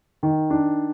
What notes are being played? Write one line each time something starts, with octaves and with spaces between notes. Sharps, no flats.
D#3
D4